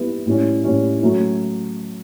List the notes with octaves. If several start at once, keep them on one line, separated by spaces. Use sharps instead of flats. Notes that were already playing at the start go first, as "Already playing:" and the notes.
Already playing: G3 B3 E4
A2 G3 C#4
A2 G3 C#4
F#3 A3 C#4